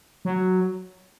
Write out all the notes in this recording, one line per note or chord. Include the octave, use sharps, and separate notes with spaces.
F#3